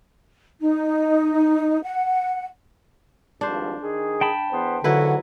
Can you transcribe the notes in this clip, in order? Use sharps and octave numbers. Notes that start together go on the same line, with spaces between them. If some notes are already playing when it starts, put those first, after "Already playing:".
D#4
F#5
G#1 G2 F3 D4 C5
D#3 G#4
G5 A5 B5
E2 B3 C5
G#1 F2 D3 F#3 E4 F#4 B4